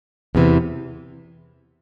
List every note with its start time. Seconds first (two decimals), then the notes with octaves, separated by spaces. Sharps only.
0.35 E2 C3 E3